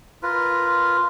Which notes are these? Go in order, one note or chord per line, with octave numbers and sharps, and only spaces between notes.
F4 A#4 B4